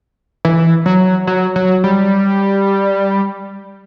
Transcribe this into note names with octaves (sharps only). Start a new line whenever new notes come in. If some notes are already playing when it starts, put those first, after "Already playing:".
E3
F#3
F#3
F#3
G3